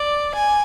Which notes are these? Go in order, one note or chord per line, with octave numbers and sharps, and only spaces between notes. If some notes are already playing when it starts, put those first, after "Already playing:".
Already playing: D5
G#5